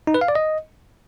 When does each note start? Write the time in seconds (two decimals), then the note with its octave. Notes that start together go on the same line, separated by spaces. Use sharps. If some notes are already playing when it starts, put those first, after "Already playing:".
0.07 D#4
0.14 B4
0.21 F5
0.28 D5
0.35 D#5